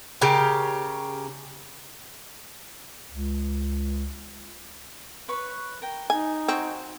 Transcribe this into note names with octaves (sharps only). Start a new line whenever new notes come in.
C#3 G4 A#4
C#2
B4 C#5 C#6
A#4 G5
D#4 G#5
C4 F#4 G#5 C#6